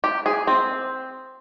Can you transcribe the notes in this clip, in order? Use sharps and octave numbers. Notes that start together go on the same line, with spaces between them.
G4
G#4
C4